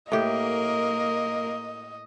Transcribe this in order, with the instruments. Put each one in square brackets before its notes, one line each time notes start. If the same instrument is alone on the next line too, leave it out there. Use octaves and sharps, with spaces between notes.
[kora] A2 G4 [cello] A#3 A#4 [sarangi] D#5